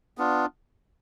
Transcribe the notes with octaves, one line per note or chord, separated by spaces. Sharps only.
B3 D4 F4